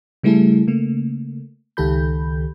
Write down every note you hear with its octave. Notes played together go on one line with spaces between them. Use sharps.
C#3 G3 A3 E4 G#4 A4
C#3 A3 A#3
C#2 D#3 G4 A4 B5 G6